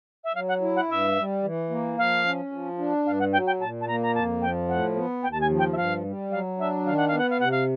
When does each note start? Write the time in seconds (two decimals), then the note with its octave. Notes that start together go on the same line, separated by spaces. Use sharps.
0.24 E5
0.34 F#3 F5
0.48 F#5
0.61 E4
0.75 F#5
0.89 G2 E5
1.17 G3
1.44 E3
1.70 A#3
1.98 F3 F5
2.25 C#4
2.52 F3
2.78 D4
3.05 G2 F5
3.19 F#5
3.32 F#3 G5
3.47 G5
3.60 A#2 A5
3.81 A5
3.87 A#3 A#5
4.02 A#5
4.15 F2 A5
4.41 F3 G5
4.68 A2 F#5
4.95 B3
5.22 D#2 G5
5.32 A5
5.41 G#5
5.50 F3
5.58 G5
5.72 E5
5.76 G2 F5
6.05 G3
6.31 F#3 F5
6.58 D4 E5
6.85 D#3 F5
6.97 F#5
7.08 B3 F5
7.18 F#5
7.30 F5
7.40 C3 F#5
7.51 F5